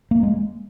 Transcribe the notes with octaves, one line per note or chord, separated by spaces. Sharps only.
A#3
G#3